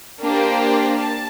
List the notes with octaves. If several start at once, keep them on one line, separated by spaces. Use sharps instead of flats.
A#3 D4 G4 C5
A5